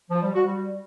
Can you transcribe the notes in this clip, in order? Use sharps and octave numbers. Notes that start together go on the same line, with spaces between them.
F3
G3
F#4
G3